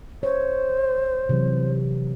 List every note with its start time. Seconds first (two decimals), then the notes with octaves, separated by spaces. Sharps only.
0.23 C5 C#5
1.29 C3 E3 F#3